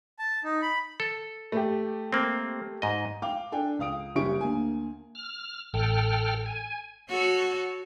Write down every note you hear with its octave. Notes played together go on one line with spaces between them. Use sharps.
A5
D#4
B5
A4
A3 G4
A#3 C4
G#2 D#5
F5 G5 D6
D4 A4 G5 G#5
C#2 F5 D#6 D7
F#1 G3 C#4 G4 C#6 D7
D2 A#3 G#5
F6
A1 A4 G5 F6
G#5
F#4 A4 C#5